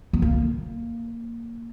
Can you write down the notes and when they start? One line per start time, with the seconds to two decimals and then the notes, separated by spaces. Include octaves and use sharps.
0.13 B3
0.22 A#3